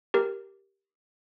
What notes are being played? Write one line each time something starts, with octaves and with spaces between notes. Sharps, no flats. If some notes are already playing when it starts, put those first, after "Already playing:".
G4 A#4